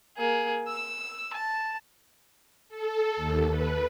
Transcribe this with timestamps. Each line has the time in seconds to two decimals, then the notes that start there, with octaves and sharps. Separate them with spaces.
0.17 A#3 G#4
0.68 E6
1.33 A5
2.69 A4
3.17 D#2
3.50 B4